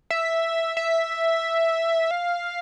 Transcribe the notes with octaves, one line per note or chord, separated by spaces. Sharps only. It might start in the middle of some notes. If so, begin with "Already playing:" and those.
E5
E5
F5